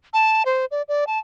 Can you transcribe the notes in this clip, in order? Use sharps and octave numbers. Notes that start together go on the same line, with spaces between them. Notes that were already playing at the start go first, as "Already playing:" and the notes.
A5
C5
D5
D5
A5